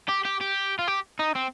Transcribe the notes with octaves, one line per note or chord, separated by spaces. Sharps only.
G4
G4
G4
F4
G4
D#4
C4